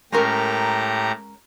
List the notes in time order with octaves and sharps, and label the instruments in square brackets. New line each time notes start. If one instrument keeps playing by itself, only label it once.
[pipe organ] A2 G4 A#5 [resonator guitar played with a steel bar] G#3 C#4 A#4